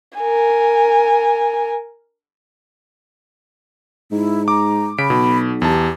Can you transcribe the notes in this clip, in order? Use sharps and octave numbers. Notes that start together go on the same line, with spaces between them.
A#4 G#5
G#2 E4
A#5 D6
C#3 B5 B6 D7
B1 B2
E2 G4 A5